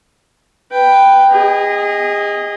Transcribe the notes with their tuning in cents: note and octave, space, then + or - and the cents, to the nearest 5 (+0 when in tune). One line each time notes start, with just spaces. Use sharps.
B4 +0 G5 +0
G#4 -30 D#5 +0